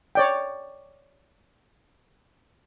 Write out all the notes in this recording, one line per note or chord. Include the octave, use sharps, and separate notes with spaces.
C#5 D5 G5